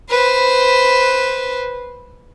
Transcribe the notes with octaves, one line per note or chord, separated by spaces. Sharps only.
B4 C5